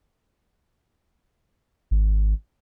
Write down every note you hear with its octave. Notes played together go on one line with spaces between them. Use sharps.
G#1